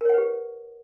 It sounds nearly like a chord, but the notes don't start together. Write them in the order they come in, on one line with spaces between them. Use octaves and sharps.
A#4 C#5 F#5 B4 G4